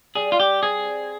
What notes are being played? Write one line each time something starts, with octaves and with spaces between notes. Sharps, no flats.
G3 G#4
F4
G4
C4 G#4